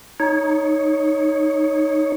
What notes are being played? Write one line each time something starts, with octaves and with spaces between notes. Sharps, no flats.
D#4 C#5